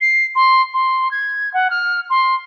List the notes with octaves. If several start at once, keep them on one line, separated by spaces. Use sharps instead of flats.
C7
C6
C6
G#6
F#5
F6
C6